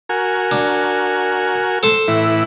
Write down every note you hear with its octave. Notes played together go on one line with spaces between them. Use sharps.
F#4 A#4 G#5
D4
A4 C5 A5
A2 E3 E4